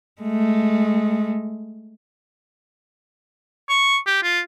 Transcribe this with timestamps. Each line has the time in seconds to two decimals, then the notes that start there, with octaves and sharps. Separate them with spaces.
0.22 G#3 A3
3.69 C#6
4.06 G4
4.23 F4